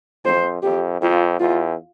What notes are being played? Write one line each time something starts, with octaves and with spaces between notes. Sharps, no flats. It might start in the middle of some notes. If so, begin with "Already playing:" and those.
F2 C5
F2 G4
F2 F4
E2 F4